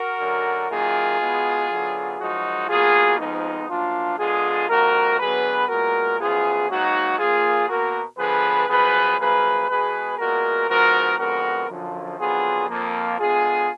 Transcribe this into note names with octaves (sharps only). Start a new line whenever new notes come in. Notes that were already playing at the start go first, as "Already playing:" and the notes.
Already playing: F#4 A#4
F#2 D3 F#3
F#2 D#3 A#3 F4 G#4
B2 G#3 B3
F#2 D3 F#3 B3
F#2 F3 G#3 D#4 F#4
B2 F#3 A#3 F4 G#4
F2 F3 G#3 B3 D#4
F#2 F3 A#3 D4 F4
D3 G#3 B3 F4 G#4
F2 D#3 A#3 F#4 A#4
F#2 D3 F#3 B3 G#4 B4
A#2 G#3 B3 F#4 A#4
F#2 F3 B3 F4 G#4
G#2 F#3 A#3 D#4 F#4
A#2 F3 A#3 F4 G#4
B2 A#3 F#4 A#4
D3 F3 B3 G#4 B4
F#2 F3 B3 G#4 B4
F#2 F3 A#3 G#4 B4
B2 G#3 B3 G#4 B4
A#2 G#3 B3 F#4 A#4
G#2 F3 B3 F#4 A#4
F2 D3 G#3 B3 F#4 A#4
F#2 D3 F3
F2 D3 F#3 B3 F4 G#4
F2 F3 A#3
D3 G#3 B3 F4 G#4